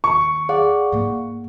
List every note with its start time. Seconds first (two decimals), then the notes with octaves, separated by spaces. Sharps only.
0.04 D#2 C#6
0.49 G#4 D5 F5 F#5
0.92 G#2 A#3